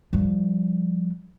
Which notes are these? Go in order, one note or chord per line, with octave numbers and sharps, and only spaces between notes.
F3 G3